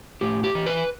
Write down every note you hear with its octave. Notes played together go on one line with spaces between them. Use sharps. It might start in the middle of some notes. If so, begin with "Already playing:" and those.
A2 G4
G4
E3
B4